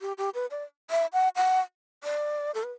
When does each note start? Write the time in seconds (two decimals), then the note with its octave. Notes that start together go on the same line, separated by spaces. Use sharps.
0.01 G4
0.18 G4
0.34 B4
0.51 D5
0.91 E5
1.13 F#5
1.36 F#5
2.04 D5
2.54 A4
2.64 B4